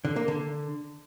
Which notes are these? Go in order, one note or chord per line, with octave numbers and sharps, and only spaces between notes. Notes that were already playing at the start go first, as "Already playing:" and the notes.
D3
A#3
D3